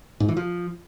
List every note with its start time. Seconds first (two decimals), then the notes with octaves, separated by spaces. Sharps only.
0.20 G#2
0.28 E3
0.37 F3